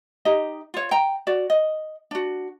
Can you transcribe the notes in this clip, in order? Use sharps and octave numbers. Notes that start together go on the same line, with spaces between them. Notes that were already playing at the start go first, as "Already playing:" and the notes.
D#4 G4 D#5
F4 C#5
G5 A#5
F#4 D5
D#5
D4 F#4